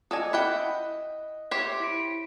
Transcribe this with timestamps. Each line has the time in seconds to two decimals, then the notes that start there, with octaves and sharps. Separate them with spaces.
0.11 A4 D5 D#5 G#5 D#6
0.33 E4 F#5 G5
1.51 G4 C5 C#5 E5
1.80 E4 B6 D7